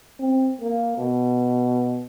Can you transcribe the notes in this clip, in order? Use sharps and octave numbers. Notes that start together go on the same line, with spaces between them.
C4
A#3
B2